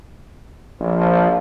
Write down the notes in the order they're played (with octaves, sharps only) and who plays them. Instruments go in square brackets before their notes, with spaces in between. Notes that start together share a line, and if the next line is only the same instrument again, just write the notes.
[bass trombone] A#1 [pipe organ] F3